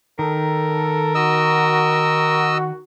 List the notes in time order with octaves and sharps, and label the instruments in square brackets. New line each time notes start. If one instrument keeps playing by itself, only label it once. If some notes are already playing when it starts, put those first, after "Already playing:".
[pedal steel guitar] D#3 [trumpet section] A4 [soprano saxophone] A#4
[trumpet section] F#4 [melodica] D#5 E6